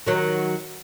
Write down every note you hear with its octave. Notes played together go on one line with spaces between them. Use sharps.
D#3 F#3